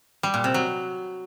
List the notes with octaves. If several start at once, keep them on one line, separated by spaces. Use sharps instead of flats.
G3
A#2
C3
F#3